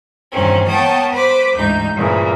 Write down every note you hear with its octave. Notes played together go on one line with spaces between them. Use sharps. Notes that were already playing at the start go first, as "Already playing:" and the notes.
E2 G2 A#2 D#3 C4 C#4
A#3 B3 C#5 G5 A5 D#6
B4 C5 B5 D6
D2 G#2 E3 D#4 G6
G2 A#2 C#3 E3 F3